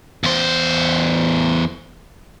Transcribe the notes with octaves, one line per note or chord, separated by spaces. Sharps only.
E2 C5